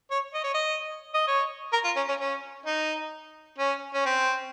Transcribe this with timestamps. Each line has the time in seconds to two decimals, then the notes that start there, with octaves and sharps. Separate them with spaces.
0.11 C#5
0.35 D#5
0.44 C#5
0.54 D#5
1.14 D#5
1.28 C#5
1.73 A#4
1.84 F4
1.96 C#4
2.09 C#4
2.20 C#4
2.66 D#4
3.59 C#4
3.94 C#4
4.06 C4